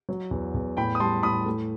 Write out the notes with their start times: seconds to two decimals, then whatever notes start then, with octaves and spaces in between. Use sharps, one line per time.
0.09 F#3
0.31 E2
0.54 E2
0.77 A2 G5 B5
0.95 D#6
1.00 G3 A5 C6
1.23 A2 B5 D#6
1.46 A3